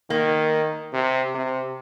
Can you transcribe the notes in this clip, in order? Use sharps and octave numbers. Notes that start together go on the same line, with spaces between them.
D#3 A#3
C3
C3